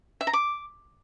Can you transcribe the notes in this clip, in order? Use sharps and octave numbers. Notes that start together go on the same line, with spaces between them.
E5
A#5
D6